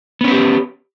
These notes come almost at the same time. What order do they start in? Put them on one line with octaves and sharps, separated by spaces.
B3 C#4 B4 G4